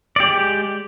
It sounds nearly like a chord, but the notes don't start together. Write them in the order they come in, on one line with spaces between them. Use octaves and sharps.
D5 G4 G#3